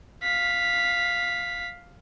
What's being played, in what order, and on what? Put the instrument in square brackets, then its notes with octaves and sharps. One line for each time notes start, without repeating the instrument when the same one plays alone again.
[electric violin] F5 B6